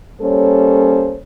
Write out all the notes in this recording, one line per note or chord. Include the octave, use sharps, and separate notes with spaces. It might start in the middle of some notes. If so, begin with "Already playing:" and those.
G3 A#3 C#4 A4 C5 C#5